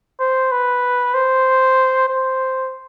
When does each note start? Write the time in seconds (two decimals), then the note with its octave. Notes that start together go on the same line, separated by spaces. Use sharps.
0.20 C5
0.51 B4
1.14 C5
2.08 C5